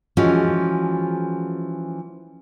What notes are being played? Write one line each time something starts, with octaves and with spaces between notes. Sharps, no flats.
E3 F3 G#3 C#4 F#4